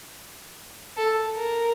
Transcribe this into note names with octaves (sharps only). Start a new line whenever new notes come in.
A4
A#4